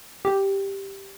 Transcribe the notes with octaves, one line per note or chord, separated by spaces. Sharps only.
G4